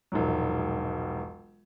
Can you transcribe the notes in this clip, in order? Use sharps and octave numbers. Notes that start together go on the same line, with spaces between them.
E1 A#1 G#2 F#3